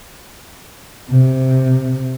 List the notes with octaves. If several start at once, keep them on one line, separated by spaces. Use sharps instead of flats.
C3